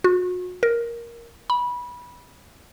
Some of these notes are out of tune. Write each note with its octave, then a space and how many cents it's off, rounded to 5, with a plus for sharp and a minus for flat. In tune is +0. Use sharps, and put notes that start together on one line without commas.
F#4 -35
A#4 +5
B5 -20